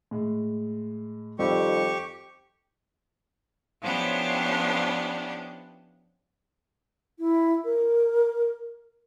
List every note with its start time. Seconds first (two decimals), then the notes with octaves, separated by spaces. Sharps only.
0.11 A2 G#3
1.39 F2 D#3 G3 C4 G4 C#6
3.81 F3 B3 C#4 D4 E4 G4
7.19 E4
7.64 A#4